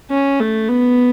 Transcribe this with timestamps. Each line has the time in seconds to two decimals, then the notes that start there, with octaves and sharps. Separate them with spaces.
0.10 C#4
0.40 A3
0.69 B3